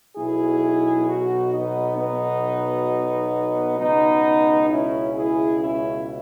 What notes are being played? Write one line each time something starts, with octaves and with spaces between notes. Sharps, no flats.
B1 B2 E4 G#4
D#4 F#4
B3 D#4
B3 D#4
C#2 B2 B3 D#4
C#4 E4
E4 G#4
C#4 E4